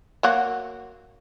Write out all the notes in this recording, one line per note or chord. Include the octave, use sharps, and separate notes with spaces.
F#3 A#3 F#4